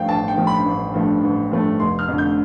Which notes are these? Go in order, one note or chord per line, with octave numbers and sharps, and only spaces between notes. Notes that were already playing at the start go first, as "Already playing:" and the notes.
Already playing: G2 F3 A3 F5 G5
A1 A5
G5
G2 F3 A3
B5
A1
G2 F3 A3
A1
G2 F3 A3
F1 C6
F6
F2 D3 A3
G6